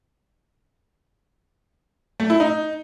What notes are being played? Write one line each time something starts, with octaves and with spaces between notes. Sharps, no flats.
A3
E4
D#4